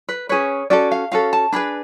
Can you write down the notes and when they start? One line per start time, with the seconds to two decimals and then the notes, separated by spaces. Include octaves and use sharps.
0.09 B4
0.29 C#4 G#4 B4 C#5
0.70 C#4 F#4 A4 D5
0.91 F5
1.11 C#4 F#4 A4 F5
1.33 A5
1.52 D4 G#4 B4 B5